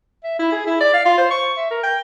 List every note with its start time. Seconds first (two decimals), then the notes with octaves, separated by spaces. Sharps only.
0.24 E5
0.39 E4
0.52 G#4
0.67 E4
0.81 D5
0.94 F5
1.06 F4
1.18 C5
1.31 C#6
1.57 E5
1.71 A#4
1.84 G5